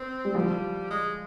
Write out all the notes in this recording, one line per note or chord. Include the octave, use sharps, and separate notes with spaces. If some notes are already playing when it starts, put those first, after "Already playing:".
Already playing: C4
G3
F3 G3
G#3